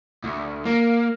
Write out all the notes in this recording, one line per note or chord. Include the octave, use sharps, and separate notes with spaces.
D2
A#3